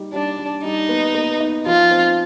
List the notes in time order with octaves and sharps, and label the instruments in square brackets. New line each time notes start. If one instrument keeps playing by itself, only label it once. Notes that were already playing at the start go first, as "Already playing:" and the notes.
Already playing: [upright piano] G3 D#4
[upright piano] G3 [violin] D4
[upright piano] G3
[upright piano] G3 [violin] D#4
[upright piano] B3
B3
D#4
[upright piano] F3 [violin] F4
[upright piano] C4